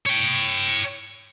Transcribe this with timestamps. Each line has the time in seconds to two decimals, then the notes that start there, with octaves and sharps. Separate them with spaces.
0.06 C#5 G5